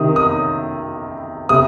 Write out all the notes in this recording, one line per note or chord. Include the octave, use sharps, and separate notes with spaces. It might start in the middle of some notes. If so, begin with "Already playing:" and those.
Already playing: C3 D#3 D#6
D#6
C3 D#6